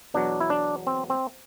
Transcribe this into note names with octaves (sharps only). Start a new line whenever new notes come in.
E2 B2 F#3 D4
E4
D4
C4
C4